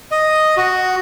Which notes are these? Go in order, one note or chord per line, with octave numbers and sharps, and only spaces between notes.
D#5
F#4